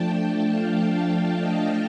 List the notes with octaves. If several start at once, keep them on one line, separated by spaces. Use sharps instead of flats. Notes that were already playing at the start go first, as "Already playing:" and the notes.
Already playing: F3 A3 D4 G5 A5
G5
F5
F5
D#5